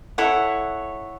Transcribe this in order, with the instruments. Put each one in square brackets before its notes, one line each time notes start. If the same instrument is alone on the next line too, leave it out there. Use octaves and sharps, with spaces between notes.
[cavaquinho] E4 A4 C#5 F#5